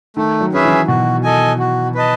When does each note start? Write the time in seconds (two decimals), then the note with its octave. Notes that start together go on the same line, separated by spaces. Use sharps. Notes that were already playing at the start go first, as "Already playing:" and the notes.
0.17 D#3 A3
0.41 F#3
0.53 D#3 C#4 G#4 B4 E5
0.65 E3
0.88 B2 F#4
1.23 A4 D#5 G#5
1.59 F#4
1.95 B4 D#5 A5